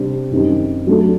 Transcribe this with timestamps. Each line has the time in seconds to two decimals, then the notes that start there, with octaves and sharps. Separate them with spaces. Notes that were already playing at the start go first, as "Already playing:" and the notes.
Already playing: C3 G3 D4 G4 C5
0.31 F#2 D#3 G3 C4 D#4
0.87 F#3 A3 D4 A4